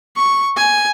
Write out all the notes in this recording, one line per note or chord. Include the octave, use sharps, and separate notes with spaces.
C#6
G#5